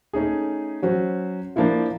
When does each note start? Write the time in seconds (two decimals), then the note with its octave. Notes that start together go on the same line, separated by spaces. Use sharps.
0.13 A3 C#4 D#4 G#4
0.82 F#3 C#4 F#4 C5
1.56 F3 A#3 D4 E4 F4